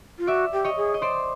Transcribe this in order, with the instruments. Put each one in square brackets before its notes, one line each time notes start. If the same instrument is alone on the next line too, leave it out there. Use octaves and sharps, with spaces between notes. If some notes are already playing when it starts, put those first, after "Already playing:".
[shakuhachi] F4
[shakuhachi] F#4 [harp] D5 E5
[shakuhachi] G4
[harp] C#5 D#5
[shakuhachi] G#4
[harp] D#5
C5 D5